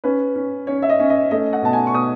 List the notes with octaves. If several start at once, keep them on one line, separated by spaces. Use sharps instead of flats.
C#4 B4
C#4
C#4 C#5
E5
D#5
C#4
D#5
A3 D#5
F#5
B2 A5
G#5
C#6
B2 D#6